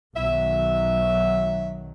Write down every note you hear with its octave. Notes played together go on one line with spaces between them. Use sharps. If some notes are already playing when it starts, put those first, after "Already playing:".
B1 D#3 F#3 E5